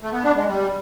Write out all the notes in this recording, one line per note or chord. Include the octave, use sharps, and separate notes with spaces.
A3
B3
D4
G#3
G3